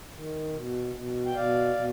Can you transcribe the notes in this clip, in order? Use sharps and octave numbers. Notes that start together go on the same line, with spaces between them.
D#3
B2
B2
G5
B2 D5 F5
B2